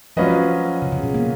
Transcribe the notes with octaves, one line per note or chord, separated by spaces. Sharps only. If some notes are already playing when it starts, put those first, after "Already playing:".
F3 F#3 C#4 F4 B4 D#5
C#3
C#3
B2
A#3